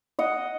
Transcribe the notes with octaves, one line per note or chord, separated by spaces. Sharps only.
D#5 F#5